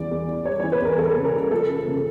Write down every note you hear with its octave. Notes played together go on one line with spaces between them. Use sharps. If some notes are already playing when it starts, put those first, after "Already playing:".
Already playing: E2 E3 G3 D5
E2
E3
G3 C#5
C#5
E3
B4
E2 A#4
E2 A4
C#3
A#4
G3
F3 A4
F#2
C#3